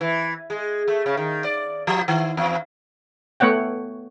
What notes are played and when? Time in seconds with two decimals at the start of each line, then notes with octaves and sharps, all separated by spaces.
0.01 E3
0.50 G#3
0.88 A3
1.06 C#3
1.17 D#3
1.44 D5
1.87 F3
2.08 D#3
2.37 E2
3.40 A3 B3 C#5 F#5 G5